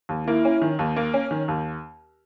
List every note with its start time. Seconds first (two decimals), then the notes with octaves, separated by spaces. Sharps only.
0.09 D#2
0.27 A#3 E4
0.45 C#4
0.62 D#3
0.79 D#2
0.96 A#3
1.14 C#4
1.31 D#3
1.48 D#2